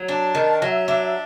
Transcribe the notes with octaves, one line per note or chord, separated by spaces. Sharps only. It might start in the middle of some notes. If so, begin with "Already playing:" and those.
Already playing: F#3
D4 A5
D#3
F#3 E5
D4